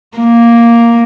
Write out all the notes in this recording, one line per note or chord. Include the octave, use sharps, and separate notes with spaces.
A#3